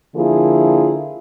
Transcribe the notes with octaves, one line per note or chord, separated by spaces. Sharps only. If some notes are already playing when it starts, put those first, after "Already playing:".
D3 F3 A#3 E4 F4 G#4